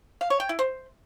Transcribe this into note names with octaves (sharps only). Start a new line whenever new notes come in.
F5
C#5
G5
E4
C5